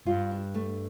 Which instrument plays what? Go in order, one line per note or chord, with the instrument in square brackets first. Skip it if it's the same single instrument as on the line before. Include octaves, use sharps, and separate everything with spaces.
[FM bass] G2 [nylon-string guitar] F4
[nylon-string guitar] D4
A3